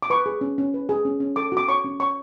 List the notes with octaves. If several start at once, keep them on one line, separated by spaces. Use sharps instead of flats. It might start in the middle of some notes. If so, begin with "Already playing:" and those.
D6
B4 C#6
G#4
C#4
C#4
B4
G#4
C#4
C#4
A4 D6
F#4 D6
C#5 C#6
C#4
C#5 C#6